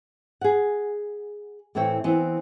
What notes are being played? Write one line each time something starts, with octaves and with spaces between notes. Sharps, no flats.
G#4 F#5
A2 E3 C4 E4 C#5 G5
E3 B3 C4